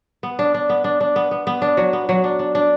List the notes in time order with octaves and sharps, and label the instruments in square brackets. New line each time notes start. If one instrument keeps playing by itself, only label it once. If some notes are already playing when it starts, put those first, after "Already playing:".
[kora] B3
D4
D4
B3
D4
D4
B3
B3
B3
D4
F#3
B3
F#3
D4
D4
D4